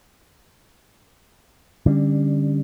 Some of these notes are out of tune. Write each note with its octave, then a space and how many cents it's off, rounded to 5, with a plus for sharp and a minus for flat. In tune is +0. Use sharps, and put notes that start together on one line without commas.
D3 +0 G3 +20 C#4 +0